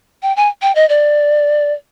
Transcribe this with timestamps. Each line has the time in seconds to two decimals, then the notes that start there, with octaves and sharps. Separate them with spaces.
0.23 G5
0.36 G#5
0.62 G5
0.75 D#5
0.89 D5